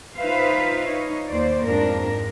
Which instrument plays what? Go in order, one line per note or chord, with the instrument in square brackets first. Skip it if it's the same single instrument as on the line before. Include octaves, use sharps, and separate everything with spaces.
[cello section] D#4 F4 B4 C5 E5 F5
D#4 C#5
D#2 C5 D5
F2 G#2 D4 A#4